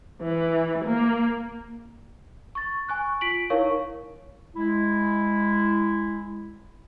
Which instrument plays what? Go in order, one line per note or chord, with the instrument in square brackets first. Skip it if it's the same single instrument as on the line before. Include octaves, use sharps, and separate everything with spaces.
[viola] E3
A#3
[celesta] C#6 A6
G#5 C#6 F#6
F4 B6 D7 F#7
D#4 E4 A#4 C#5 F5 C#6
[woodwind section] G#3 E4